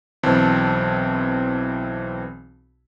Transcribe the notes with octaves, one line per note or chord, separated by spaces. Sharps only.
B1 E3 C4 A5